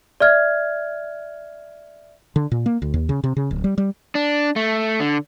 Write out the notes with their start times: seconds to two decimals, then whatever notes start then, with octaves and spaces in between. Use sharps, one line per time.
0.20 D5 E5 F6 G#6
2.36 D3
2.52 A#2
2.66 A#3
2.82 D2
2.94 D#2
3.09 C#3
3.24 C3
3.37 C#3
3.51 D1
3.64 G3
3.78 G3
4.15 D4
4.56 A3
5.00 D3